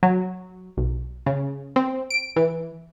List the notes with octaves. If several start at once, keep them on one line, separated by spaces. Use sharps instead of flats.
F#3
B1
C#3
C4
D7
E3